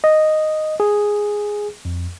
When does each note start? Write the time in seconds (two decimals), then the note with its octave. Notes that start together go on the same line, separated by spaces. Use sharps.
0.04 D#5
0.80 G#4
1.85 F2